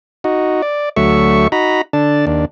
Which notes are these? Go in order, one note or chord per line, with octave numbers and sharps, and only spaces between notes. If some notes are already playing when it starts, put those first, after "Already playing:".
D#4 F#4
D5
D2 F#3 A3 E5 C#6
D#4 F#4 A#5 B5
D3 D4 A5
D#2 D4